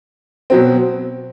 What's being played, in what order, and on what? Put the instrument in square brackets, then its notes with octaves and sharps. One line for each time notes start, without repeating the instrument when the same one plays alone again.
[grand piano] B2 F#3 C4